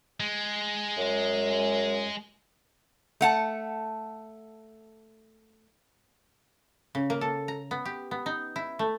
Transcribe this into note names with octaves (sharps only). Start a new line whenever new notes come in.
G#3
F#2
A3 F#5 A5
C#3
A#3
A4
A#5
B3
G4
B3
D#4
E4
A3